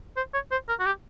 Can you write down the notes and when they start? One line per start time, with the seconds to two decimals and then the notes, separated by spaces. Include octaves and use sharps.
0.17 C5
0.34 C#5
0.51 C5
0.69 A#4
0.80 F#4
0.86 G4